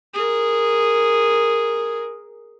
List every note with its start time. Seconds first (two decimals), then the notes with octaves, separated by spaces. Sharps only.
0.14 G#4 A#4